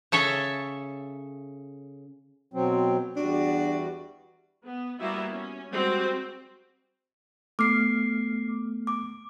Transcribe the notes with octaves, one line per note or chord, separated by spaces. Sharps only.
C#3 A4 C#5 E5
B2 F#3 C4
E2 G3 D4 F#4
B3
G3 A#3 B3 E4 F#4 E5
C#4
G3 G#3 C4 F#4
A3 B3 D6 F6 C7
D6